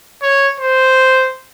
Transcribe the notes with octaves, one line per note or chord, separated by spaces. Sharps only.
C#5
C5